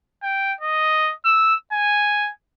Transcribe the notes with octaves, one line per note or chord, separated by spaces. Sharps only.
G5
D#5
E6
G#5